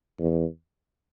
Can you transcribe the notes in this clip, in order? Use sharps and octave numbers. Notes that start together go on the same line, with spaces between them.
E2